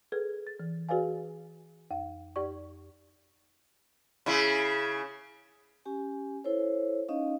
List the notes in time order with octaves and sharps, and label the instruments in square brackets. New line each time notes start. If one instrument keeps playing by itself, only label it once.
[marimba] G#4 A4 B4 G#6
A6
E3
F#4 G#4 B4 D5 F5 G#5
F2 F5
F2 G4 D5 C#6
[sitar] C#3 E4
[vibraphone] C#4 G4 G#5
E4 A4 C5 C#5
C#4 D#4 D#5 F5